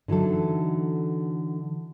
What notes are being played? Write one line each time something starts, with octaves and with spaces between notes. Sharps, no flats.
D3 E3 F#3 D#4 A4